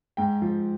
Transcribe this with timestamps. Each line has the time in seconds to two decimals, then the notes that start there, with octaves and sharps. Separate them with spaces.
0.17 G#2 G5
0.42 F3